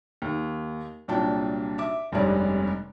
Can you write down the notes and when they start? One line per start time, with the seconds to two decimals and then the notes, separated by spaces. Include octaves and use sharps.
0.22 D#2
1.08 C2 A#2 F#3 D4 G5 A5
1.78 E5 D6
2.12 F1 G2 C3 G#3 C#4 D5